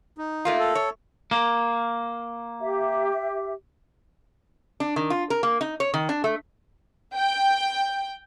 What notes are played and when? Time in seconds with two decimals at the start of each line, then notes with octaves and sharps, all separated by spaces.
0.18 D#4
0.45 A3 A#3 F4
0.59 A4
0.75 C#5
1.31 A#3
2.60 G4 E5
4.80 D4
4.96 D#3
5.10 F4
5.30 A#4
5.43 A#3
5.61 D#4
5.80 C#5
5.94 D#3
6.09 D4
6.24 A3
7.16 G5